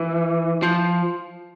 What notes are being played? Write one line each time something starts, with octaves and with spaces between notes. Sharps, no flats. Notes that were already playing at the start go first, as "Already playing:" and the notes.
Already playing: E3
F3